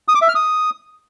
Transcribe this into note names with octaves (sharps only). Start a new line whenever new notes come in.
D#6
D6
E5
F6
D#6